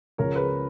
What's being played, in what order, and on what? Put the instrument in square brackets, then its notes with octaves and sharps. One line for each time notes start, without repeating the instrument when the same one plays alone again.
[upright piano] C#2 C#3 F3 G#3 A#4 C#5
G#4 B4